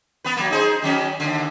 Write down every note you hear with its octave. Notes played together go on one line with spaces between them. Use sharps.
B3 B4
F#3 A#3
D#4 G#4 C5
D#3 F#3 C#4
D#2 D3